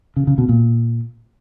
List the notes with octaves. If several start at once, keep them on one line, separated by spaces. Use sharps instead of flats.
C#3
C#3
B2
A#2